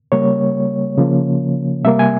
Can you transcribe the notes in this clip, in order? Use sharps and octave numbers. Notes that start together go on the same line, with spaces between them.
C#3 G3 A#3 C#5
C#3 F3 A#3
C3 G3 A#3 E5
G#5